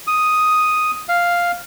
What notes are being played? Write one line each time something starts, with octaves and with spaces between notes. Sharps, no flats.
D#6
F5